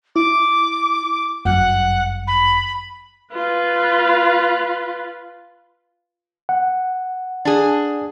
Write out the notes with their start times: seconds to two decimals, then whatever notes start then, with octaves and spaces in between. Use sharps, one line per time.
0.16 E4 D6
1.45 G1 F#2 F#5
2.27 B5
3.33 F4 B4
6.49 F#5
7.45 D4 G#4